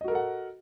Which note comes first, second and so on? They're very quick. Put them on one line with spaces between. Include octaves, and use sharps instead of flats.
D#5 F#4 A#4 A4 F#5